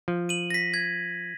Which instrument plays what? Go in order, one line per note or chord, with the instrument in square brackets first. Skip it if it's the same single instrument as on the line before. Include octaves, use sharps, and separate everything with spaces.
[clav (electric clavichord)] F3
[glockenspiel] D#7 F#7
A#6 B6
G#6